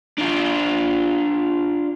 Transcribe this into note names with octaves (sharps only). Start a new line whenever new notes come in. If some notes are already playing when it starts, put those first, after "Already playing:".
D4 F4